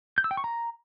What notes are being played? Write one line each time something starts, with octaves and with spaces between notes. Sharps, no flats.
G6
E6
G5
C#6
A#5